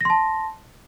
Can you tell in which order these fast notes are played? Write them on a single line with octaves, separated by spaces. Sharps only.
A#6 C6 A5